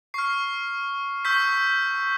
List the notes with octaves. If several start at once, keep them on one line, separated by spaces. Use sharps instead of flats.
C#6 F6 C7
C#6 E6 G6 B6